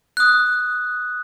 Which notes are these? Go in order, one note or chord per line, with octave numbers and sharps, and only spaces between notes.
D#6 F#6